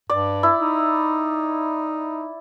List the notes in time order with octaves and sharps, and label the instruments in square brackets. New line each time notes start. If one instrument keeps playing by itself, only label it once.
[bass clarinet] G2 [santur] D5
[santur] E4
[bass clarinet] D#4